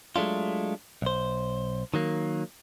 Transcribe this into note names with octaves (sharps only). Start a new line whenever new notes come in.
F#3 G#3 A3 D4 F4
B1 C5
D#3 F#3 A#3